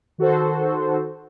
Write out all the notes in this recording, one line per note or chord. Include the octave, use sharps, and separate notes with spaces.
D#3 F#4 A4 C5